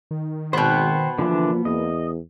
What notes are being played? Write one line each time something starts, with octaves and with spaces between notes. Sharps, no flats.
D#3
G#1 B2 B3 C5 G5
D3 E3 F3 A#3 D4
E2 D#5